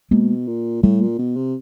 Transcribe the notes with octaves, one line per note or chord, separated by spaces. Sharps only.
B2 G#3 A#3
A#2
A2 G3 A3
A#2
B2
C3